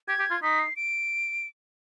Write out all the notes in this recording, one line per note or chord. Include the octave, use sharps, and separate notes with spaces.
G4 G#6
G4
F4
D#4 B6
C7
D7